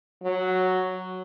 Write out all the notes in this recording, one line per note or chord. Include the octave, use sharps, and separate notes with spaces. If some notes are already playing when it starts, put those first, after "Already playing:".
F#3